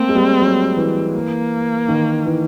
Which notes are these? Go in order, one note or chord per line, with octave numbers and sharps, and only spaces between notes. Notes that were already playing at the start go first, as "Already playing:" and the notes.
Already playing: A3 A#3 C4
G#3
G3
F#3
E3
A#3
D#3
E3